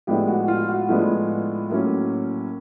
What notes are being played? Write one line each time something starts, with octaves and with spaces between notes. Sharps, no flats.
A2 F3 G#3 B3 D4 G4
F#4
F4
F#4
A2 F3 G#3 B3 D4 F4
A2 F#3 A#3 C#4